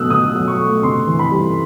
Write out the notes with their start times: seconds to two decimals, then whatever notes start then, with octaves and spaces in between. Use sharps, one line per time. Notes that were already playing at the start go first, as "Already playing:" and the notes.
Already playing: B2 F#3 A3 D#6 E6 F#6
0.10 B2 D#6
0.35 F#3
0.48 C#6
0.60 A3
0.83 C3 C6
1.07 E3
1.19 B5
1.31 G3